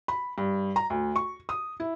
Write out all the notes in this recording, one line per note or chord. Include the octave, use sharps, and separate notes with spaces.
B5
G2
A#5
D2
C#6
D#6
E4